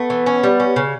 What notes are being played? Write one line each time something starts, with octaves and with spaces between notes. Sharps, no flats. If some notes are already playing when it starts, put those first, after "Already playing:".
Already playing: A3 B3
E3
C#4
G3
C#4
C#3